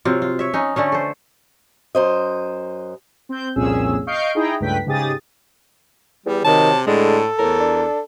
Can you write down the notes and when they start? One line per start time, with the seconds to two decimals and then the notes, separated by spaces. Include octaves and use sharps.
0.05 C3 F#3 F4
0.22 F4
0.39 C#5 E5
0.54 C#4 D#4
0.76 D3 A3 C#4
0.92 A4 C5
1.95 F#2 C5 D#5
3.29 C4 G6
3.56 C2 F2 A#2 C#4 G#4 E6
4.07 D#5 F5 C#6 G6 C7 D7
4.35 D#4 E4 G#4 D#5 G5 A#5
4.60 C#2 G2 A3 B4 G5 B6
4.86 G#2 C#3 G4 G#4 D#6 A6
6.26 E2 G3
6.45 C3 D#3 F#3 A5
6.87 A2 D3 G#3 A4
7.39 E2 A2 A#4
7.60 D4